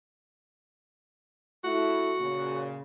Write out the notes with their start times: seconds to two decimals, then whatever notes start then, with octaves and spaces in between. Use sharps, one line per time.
1.64 A3 E4 F#4
2.19 A#2 C#3